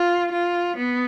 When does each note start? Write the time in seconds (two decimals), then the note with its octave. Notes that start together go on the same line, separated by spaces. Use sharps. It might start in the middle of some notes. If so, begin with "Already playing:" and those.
Already playing: F4
0.32 F4
0.76 B3